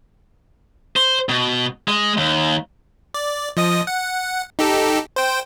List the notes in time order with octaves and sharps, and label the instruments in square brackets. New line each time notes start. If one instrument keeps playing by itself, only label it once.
[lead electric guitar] C5
B2
G#3
D#2
[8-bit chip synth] D5
F3 D#5 D#6
F#5
D#4 G4 A4
C5 G5